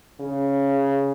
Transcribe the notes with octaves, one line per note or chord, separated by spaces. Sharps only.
C#3